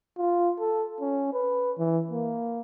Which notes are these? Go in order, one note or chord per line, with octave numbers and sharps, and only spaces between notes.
F4
A4
C#4
B4
E3
A#3